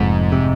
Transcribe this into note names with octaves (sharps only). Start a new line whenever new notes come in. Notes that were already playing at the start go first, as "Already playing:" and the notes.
Already playing: F1 F2 G#2
C3